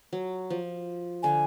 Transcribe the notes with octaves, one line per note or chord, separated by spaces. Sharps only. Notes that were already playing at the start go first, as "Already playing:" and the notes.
F#3
F3
D3 G#5